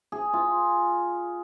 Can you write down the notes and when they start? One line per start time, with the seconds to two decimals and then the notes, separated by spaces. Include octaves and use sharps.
0.12 G#4
0.33 F4